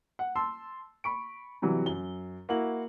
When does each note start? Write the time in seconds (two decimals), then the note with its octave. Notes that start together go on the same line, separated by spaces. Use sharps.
0.19 F#5
0.35 A5 C6 E6
1.04 B5 C#6 D7
1.62 C3 E3 F#3 G3
1.86 F#2 G7
2.49 A#3 E4 F#4 F#7